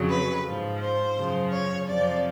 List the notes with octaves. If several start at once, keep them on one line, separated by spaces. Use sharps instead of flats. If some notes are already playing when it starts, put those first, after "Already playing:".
Already playing: F2 C#3 F#3
B4
G#2 F3
C5
F#2 C#3 F3
C#5
F2 C3 F3 D5